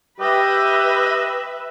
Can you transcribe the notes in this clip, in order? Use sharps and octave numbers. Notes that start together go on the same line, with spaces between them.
G4 B4 D#5 E5